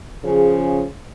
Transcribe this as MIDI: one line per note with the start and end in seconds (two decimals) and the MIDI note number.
0.24 0.83 49
0.24 0.83 53
0.24 0.83 61
0.24 0.83 68